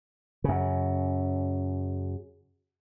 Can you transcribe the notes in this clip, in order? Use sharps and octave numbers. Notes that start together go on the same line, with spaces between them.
F#2 C#3